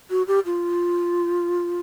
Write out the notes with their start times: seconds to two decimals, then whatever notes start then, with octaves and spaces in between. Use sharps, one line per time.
0.11 F#4
0.28 G4
0.46 F4